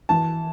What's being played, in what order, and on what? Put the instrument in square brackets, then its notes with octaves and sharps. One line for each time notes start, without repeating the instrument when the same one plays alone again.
[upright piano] E3 A5